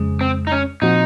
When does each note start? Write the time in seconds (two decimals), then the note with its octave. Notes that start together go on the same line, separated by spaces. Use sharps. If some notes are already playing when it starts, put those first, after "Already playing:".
Already playing: F2 C#3 G#3
0.21 C4
0.47 D#4
0.52 C#4
0.82 A#2 F3 C4 D#4 F#4